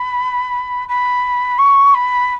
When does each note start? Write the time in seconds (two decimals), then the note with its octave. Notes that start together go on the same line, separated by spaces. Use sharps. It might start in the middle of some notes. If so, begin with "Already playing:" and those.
Already playing: B5
0.88 B5
1.58 C#6
1.94 B5